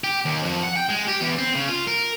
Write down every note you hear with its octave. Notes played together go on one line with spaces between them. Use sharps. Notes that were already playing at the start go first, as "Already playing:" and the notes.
G4
D#2
F2
F#5
G5
G#3
G4
E2
C4
C#3
F4
A#4